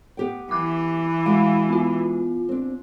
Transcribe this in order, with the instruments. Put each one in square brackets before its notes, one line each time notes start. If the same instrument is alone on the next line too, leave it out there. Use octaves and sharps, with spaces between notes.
[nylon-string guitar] B3 G4 G5
[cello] E3 [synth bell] D6 F#6
[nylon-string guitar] G#3 E4 F#4 [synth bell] F5
[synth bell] B3 F4
[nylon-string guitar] C4 D4